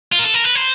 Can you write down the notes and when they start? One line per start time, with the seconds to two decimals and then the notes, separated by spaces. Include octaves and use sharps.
0.12 F4
0.18 A#4
0.24 A4
0.34 A#4
0.44 B4
0.55 C5